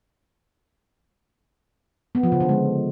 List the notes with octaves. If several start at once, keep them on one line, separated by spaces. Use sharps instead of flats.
B3
F3
C#3
D3
G#3